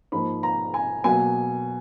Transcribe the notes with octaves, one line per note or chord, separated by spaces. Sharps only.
G#2 F3 A#3 B5
A#5
G#5
B2 F#3 A#3 G#5